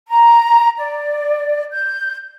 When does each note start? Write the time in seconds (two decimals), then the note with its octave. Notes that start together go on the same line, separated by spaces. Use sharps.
0.08 A#5
0.77 D5
1.71 G6